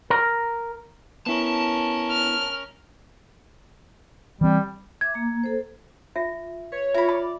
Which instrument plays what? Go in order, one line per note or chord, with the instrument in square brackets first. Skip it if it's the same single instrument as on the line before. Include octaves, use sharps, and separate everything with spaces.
[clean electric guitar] A#4
[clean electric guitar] B3 E4 [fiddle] C#4 A#4 [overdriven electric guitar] A5
[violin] F6
[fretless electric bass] E3 C4 [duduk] G3
[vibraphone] E5 D6 [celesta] G#6
[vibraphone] A#3 A#5
A4 C5
[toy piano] F4 E5
[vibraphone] B4 [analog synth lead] C#5
[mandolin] E4 B5 [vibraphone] F4 [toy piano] E5
[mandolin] D5 [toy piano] B5